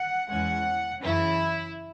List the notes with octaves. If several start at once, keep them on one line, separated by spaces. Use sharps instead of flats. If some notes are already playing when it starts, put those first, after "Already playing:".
Already playing: F#5
E2 E3 G#3 C#4 F#5
F#2 C#3 E3 C#4 E4